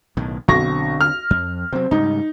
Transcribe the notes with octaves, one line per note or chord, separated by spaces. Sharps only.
B1 A2 D#3
B1 D3 C4 C#6 A#6
F6
F2
C3 F#3 C4
G#2 C#3 G3 D#4